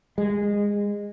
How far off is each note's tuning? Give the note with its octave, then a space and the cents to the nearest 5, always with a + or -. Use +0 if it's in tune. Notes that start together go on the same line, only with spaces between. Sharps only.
G#3 -20